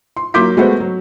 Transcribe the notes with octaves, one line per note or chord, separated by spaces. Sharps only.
C6
F#3 A#3 C6 D6 G6 B6
G#3 A3 B3 F#4 C5
F#3